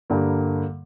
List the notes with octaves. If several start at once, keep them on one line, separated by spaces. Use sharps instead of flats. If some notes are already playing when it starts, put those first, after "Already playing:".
G2 D3 G3 A#3